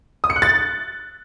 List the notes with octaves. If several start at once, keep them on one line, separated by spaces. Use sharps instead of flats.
D#6
C#7
F#6
A6